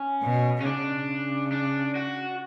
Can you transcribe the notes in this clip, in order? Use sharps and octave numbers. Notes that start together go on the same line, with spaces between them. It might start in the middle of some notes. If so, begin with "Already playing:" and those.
Already playing: C#4
B2
C#4
C#3 D4
D4
F#4